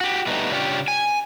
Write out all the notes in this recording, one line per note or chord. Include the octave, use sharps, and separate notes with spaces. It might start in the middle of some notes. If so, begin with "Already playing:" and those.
F#4 G4
G3 A3 B3 D#4
C#3 D4 F4 G4 C#5
G#5